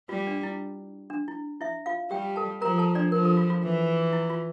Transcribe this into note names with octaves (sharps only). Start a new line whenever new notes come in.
G3 F4
D4
E4
D4
E4
E4 E5
F4 F5
G3 G4 G5
A4 A5
F3 A#4 A#5
A4 A5
D4 D5
F3 A#4
A4
F4
F4
E3
E4
F4